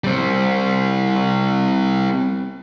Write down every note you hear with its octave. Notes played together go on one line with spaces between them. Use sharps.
G3 C4